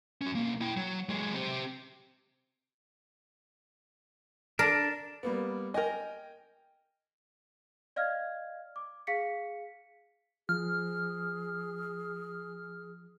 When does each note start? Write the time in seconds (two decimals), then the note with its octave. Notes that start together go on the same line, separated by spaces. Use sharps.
0.22 C#4 F#4
0.35 B1 A#3
0.61 E4 G5
0.77 F#3
1.09 F#3 G#3
1.34 C4 G4
4.59 D4 A#4
5.23 G3 A#3 B3
5.74 A#4 D#5 G5 G#5
7.96 D5 D#5 F5 F6 G#6
8.76 D6
9.07 G#4 F5 B6 C#7
10.49 F3 G#4 F6